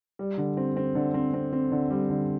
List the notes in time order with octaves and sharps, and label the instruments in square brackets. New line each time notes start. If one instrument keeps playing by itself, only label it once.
[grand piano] G3
D3
C4
C4
D3
C4
C4
C4
D3
G3
D3